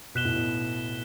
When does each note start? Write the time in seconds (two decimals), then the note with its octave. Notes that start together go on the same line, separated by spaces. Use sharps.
0.15 B2 F#6 B6 E7 G7
0.25 A2
0.35 B2